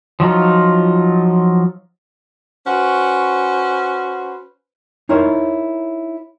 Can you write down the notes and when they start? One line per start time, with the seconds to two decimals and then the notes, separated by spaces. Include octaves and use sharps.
0.20 F3 F#3 D#4 F4
2.66 C#4 F#4 B4 C5
5.09 D#4 E4 A#4 C5 C#5